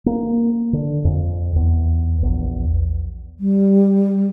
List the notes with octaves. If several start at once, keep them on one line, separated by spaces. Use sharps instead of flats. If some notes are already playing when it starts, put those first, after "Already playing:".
A#3
D3
F2
E2
A#1 E2
G3